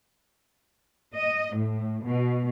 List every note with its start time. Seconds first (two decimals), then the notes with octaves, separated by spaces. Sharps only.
1.18 D#5
1.55 A2
2.05 B2